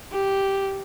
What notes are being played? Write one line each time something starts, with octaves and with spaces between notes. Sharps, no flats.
G4